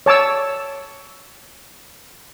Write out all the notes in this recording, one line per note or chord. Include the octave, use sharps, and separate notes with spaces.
C#5 A5 D6 E6